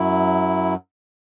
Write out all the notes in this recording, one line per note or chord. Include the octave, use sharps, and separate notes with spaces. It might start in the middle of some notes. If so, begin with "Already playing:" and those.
Already playing: F#2 F#3 E4